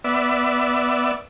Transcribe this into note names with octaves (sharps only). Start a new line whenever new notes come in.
B3 D5 E5